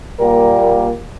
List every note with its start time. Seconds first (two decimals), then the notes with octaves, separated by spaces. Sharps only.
0.20 A#2 G3 A#3 A#4